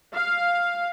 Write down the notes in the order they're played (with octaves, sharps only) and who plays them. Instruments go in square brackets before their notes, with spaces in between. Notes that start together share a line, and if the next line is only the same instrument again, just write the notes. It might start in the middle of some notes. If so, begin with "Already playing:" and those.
[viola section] F5